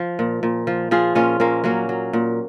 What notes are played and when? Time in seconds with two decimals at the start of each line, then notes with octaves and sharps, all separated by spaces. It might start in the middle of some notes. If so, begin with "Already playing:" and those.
Already playing: F3
0.19 A#2
0.43 A#2
0.67 F3
0.91 F3 F4 G#4
1.15 A#2 C#4 F4
1.40 A#2 A#3 C#4
1.64 F#3 A#3 C#4
1.89 F#3
2.13 A#2